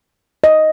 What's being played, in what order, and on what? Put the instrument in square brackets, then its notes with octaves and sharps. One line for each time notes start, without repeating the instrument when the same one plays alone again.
[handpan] D#5